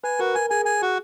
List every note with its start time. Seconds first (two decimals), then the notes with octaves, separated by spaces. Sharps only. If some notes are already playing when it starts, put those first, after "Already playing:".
0.04 B4 G#5
0.19 F#4 A#4
0.35 A#4 G#5
0.50 G#4 G#5
0.65 G#5
0.82 F#4